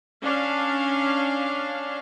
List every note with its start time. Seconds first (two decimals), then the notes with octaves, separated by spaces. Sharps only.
0.23 C#4 D4 F5